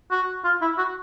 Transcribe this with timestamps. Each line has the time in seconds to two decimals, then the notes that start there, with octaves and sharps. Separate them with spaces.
0.11 F#4
0.44 F4
0.62 E4
0.78 F#4